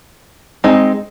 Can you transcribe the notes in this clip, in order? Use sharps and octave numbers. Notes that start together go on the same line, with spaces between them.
G#3 C4 D#4 G#4